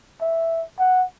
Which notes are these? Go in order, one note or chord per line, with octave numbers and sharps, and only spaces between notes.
E5
F#5